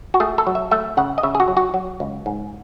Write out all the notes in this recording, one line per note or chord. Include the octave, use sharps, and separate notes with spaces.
F#4
A3 G#4
A4
F#3
E5
A3 E5
C#3 F#5
D#5
C#3 E5
G#4
F#4
F#3
F#4
F#3
C#2
G#2